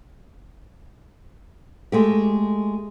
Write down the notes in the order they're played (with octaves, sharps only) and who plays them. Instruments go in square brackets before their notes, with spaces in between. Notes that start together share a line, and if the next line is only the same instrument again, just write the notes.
[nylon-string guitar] G#3 A3 G4